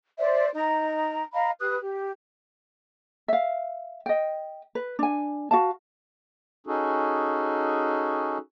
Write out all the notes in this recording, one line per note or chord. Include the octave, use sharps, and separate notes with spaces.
C5 D5 E5
D#4 A#5
D#5 F5 A#5 B5
G4 B4 D#6 F#6
G4
E5 F5
D#5 G5
B4
D4 G#5
F#4 F5 A5
C#4 D#4 F#4 G#4 A4